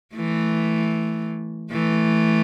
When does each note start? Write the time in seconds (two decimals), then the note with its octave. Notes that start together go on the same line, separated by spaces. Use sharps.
0.15 E3 A3
1.71 E3 A3